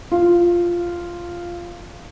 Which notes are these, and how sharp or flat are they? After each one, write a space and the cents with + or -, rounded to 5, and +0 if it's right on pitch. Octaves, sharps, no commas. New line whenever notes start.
F4 -5